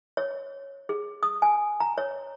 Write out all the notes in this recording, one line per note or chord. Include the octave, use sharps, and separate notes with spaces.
C#5
G#4
D#6
G#5
A#5
C#5